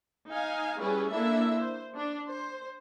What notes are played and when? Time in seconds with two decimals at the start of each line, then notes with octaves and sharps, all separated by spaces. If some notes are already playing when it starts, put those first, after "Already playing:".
0.30 D#4 F5 G#5
0.80 G3 C#4 E4 G#4 B4
1.11 A#3 D4 E4 A4 E5
1.58 C5
1.96 D4
2.27 C5